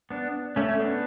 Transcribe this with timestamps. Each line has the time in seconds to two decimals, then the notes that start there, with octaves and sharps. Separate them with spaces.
0.10 B3 D4
0.56 A3 C#4
0.74 C#4
0.80 B3 D4